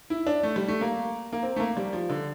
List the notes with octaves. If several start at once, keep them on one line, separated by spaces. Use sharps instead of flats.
E4
D4
A3
G3
A3
A#3
A#3
C4
A3
A#3
G3
F3
D3